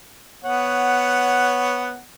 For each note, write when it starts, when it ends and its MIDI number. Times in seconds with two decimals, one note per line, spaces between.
0.45 1.99 59
0.45 1.99 73
0.45 1.99 78